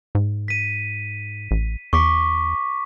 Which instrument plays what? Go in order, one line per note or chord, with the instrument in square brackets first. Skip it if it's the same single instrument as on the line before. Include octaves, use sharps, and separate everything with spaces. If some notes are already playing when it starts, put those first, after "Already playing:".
[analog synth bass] G#2
[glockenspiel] B6 D#7
[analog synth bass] A1
[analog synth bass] E2 [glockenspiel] C#6 D6 B6